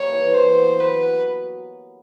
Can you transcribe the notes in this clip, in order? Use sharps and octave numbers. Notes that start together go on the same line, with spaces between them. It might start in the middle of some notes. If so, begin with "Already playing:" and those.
Already playing: G3 A#3 C#5
E3
F#4 C5
B3
F#3 B4
F#3